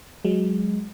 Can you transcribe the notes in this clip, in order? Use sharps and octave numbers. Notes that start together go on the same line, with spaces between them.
F#3 G#3